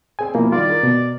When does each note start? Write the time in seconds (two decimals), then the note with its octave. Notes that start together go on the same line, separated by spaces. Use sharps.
0.19 C4 G#4 G#5
0.35 B2 F3 A#3 E4
0.52 D#3 E3 G3 F4 D5
0.69 A#4
0.83 B2